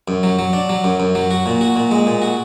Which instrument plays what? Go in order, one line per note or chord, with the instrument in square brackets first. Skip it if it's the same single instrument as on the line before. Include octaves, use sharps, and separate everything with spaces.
[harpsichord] F#2
F#3
F#3
D4
F#3
F#2
F#2
F#3
F#4
A#2
F#4
A#2
G#3
A#2
F#4